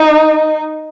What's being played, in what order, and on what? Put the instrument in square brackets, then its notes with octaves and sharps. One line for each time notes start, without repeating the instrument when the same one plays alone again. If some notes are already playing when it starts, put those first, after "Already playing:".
Already playing: [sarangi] D#4